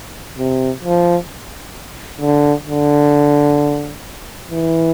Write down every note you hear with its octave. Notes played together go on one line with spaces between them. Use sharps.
C3
F3
D3
D3
E3